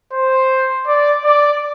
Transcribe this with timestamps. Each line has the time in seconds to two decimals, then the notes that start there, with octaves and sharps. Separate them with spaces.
0.13 C5
0.88 D5
1.25 D5